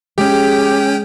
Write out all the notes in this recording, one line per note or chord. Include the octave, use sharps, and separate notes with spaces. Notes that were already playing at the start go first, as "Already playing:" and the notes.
G#3 C#4 G4 G5